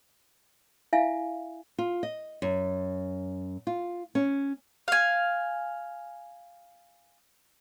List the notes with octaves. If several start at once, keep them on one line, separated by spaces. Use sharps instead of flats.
E4 E5 F5 G#5
F4
D#5
F#2
F4
C#4
F5 G#5